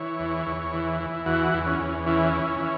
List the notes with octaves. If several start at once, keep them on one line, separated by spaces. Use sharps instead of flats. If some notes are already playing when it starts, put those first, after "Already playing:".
Already playing: E3 C#5
E2
E2
E3
E3
E2 F#4
E2
C#4
E2
E3 C#4
E3
E3